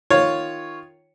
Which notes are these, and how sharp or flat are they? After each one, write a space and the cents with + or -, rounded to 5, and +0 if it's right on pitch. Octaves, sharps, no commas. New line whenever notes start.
D#3 +0 F4 +0 C#5 +0